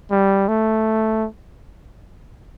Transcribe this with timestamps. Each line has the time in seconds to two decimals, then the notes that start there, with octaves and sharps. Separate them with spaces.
0.11 G3
0.48 A3